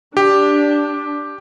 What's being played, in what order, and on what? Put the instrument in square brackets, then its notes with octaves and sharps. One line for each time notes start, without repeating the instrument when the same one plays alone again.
[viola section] D4 [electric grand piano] G4